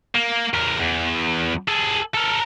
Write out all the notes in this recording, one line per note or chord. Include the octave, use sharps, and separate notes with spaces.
A#3
E2 A#4
E2
G#4 A4
A4 A#4